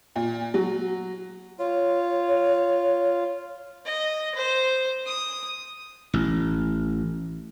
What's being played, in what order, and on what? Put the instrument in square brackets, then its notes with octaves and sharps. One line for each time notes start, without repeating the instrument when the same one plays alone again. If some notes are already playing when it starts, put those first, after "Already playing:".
[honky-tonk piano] A#2
F#3
[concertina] F4 [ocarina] C#5
[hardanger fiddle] D#5
C5
D#6
[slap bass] A1